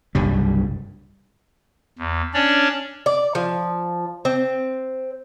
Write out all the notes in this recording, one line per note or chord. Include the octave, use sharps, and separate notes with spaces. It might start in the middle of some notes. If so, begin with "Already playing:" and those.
F#1 C2 G2 G3
E2
C#4 D4 C#5 D5
D5
F3
C4